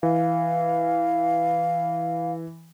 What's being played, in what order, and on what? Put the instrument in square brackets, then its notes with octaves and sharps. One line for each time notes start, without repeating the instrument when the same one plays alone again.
[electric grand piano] E3 [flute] F5